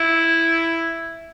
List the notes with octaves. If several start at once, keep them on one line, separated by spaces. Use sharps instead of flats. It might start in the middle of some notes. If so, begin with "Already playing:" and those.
Already playing: E4